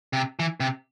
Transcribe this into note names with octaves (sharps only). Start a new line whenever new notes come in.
C3
E3
C3